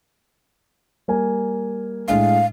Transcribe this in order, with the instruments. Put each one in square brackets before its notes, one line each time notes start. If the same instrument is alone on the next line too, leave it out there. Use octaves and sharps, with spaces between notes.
[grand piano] G3 A#3 G#5
[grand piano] A2 G#3 D4 [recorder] F5